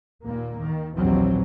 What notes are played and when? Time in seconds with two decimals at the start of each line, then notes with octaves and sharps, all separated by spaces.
0.24 D#2 A#2 A#3
0.64 D#3
0.96 A#1 D#2 E3 F#3 C4